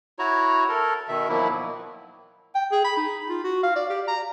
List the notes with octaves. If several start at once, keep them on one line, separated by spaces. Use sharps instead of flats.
E4 F#4 C#5 A#5
A4 A#4
B2 D#3 E5
B2 D#3 F3 F#3 A#3 E4
G5
G#4
B5
D#4
F4
F#4
F5
D5
G4
A#5